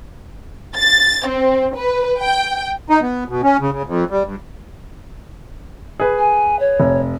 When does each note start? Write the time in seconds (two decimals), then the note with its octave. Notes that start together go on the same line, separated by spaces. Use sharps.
0.77 A6
1.28 C4
1.76 B4
2.20 G5
2.90 D#4
3.02 B3
3.28 B2
3.43 C#4
3.60 C#3
3.72 C#3
3.86 F2
4.10 G3
4.24 G2
6.00 G#4 B4
6.19 G#5
6.59 C#5
6.80 F1